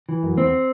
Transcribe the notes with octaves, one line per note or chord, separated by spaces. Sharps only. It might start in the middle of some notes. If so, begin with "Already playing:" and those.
E3
F#2
E2 C4